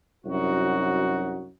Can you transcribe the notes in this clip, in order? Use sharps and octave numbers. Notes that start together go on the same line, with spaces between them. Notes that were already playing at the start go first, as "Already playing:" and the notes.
C2 F#2 D#4 F#4